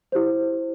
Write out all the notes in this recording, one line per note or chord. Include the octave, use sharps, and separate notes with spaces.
E4 G4 C5